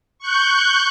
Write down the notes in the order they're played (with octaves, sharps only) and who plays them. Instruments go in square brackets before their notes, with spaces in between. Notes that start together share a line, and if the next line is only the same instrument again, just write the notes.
[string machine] C#6 F#6 G6